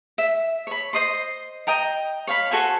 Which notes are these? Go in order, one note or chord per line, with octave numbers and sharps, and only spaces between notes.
E5
C#5 B5
C5 D#5 C6
D#5 G5 A#5
C#5 F5 B5
F#4 A4 C5 G#5